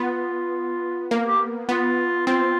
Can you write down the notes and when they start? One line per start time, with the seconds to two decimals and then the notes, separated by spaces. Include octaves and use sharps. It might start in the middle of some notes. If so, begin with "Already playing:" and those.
Already playing: B3 F4
1.11 A#3
1.25 G4
1.69 B3 F4
2.27 C4 F4